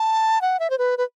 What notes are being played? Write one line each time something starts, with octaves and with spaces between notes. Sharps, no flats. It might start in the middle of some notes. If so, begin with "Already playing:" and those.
Already playing: A5
F#5
E5
C5
B4
B4